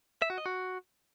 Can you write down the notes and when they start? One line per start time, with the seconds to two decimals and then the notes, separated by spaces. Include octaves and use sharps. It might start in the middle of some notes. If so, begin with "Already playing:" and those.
0.22 E5
0.30 F#4
0.38 D#5
0.46 F#4